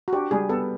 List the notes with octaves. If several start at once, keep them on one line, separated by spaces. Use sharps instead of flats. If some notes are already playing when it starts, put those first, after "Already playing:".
F#4
D4 G4
G3 G#4
B3 A4